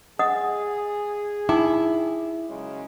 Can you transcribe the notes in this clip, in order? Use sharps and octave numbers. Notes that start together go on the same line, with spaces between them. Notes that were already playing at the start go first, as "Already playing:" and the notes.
G#4 D#5 F#5 D#6
D#4 E4 G5 D6
F#2 C#3 G#3